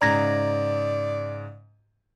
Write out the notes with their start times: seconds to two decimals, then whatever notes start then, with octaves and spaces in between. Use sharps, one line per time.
0.02 G#2 C#3 D5 A#5 G#6 A#6